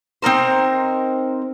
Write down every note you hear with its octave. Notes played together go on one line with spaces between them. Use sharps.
C4 D#4 A#4 C5